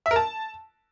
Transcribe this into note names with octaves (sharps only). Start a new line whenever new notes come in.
E5
A#4
A5